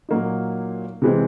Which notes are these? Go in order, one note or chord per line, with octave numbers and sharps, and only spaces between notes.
A#2 F#3 A#3 D#4
C3 E3 G#3 C4